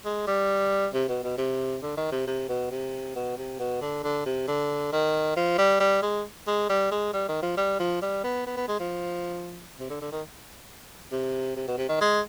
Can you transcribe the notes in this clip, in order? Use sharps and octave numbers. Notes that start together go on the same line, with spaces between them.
G#3
G3
C3
B2
B2
C3
D3
D#3
C3
C3
B2
C3
B2
C3
B2
D3
D3
C3
D3
D#3
F3
G3
G3
G#3
G#3
G3
G#3
G3
D#3
F3
G3
F3
G3
B3
B3
B3
G#3
F3
C3
D3
D3
D#3
C3
C3
B2
C3
D#3
G#3